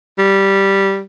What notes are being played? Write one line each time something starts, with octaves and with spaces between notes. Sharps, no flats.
G3